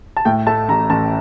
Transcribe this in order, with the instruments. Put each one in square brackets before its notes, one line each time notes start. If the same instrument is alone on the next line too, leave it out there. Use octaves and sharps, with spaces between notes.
[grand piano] A5
A2 G5
A3 A5
A1 A#5
A1 A5